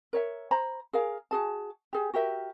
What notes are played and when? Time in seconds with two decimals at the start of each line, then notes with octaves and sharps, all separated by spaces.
0.13 A#4 C#5 E5
0.51 C5 A#5 B5
0.93 G#4 A#4 F5
1.31 F#4 G#4 A5
1.93 G4 G#4
2.13 F#4 G4 A#4 E5